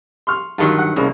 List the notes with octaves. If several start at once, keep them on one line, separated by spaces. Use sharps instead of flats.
C6 C#6 F6
G2 D3 D#3 F#3 F4
F#5
C2 C#3 A#3